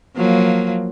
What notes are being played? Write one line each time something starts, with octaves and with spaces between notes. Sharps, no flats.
F3 F#3 A#3